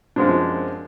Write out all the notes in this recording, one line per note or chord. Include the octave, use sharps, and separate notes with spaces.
F#2 F3 F#3 G#3 C4 D4